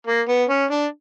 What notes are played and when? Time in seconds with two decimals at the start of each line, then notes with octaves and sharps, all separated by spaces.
0.07 A#3
0.28 B3
0.49 C#4
0.71 D4